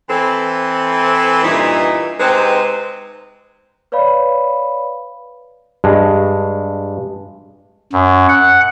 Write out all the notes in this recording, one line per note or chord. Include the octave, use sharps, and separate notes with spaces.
E3 C4 A4
G2 A#2 E3 D#4 E4
C3 G#3 C4 D#4 B4 C5
B4 C#5 D5 F5 B5
G2 G#3
F#2
F#5